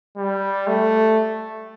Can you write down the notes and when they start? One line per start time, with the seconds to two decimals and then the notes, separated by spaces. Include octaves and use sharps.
0.17 G3
0.67 A3